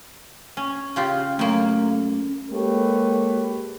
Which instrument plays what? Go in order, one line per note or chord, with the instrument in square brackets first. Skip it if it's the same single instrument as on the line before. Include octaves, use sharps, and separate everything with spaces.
[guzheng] C#4
C#3 F4 G4
[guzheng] F#2 A#3 [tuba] A3
[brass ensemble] G#3 A#3 G4 A4 B4 C#5